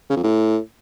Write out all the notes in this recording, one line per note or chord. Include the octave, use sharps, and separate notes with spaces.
C#3
F2
A2